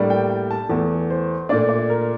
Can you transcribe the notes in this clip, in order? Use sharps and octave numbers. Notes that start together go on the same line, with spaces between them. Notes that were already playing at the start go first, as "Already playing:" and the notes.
Already playing: A2 G3 A#3 D4
G5
G5
A5
E2 E3 A3
C5
A#2 A3 D4 D5
D5
A#4